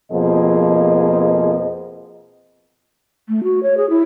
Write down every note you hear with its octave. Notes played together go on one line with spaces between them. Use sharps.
F2 B2 F3 A#3 G#4 D#5
A3
F#4
C#5
G#4
E4